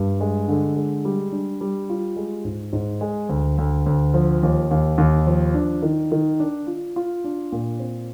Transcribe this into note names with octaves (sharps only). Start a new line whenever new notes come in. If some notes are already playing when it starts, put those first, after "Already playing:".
Already playing: G2
G#3
D3
G#3
G3
D4
G3
F4
G#3
G#2
G#2
G#3
D2
D2
D2
F3
D#2
D#2
D#2
F3
D4
D#3
D#3
D4
F4
F4
D4
A#2
C4